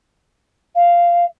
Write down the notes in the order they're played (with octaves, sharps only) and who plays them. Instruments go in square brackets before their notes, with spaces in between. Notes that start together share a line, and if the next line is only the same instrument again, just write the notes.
[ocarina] F5